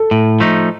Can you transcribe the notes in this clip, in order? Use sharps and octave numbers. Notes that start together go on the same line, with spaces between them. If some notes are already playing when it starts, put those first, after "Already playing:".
Already playing: A4
A2
F3 A3 D#4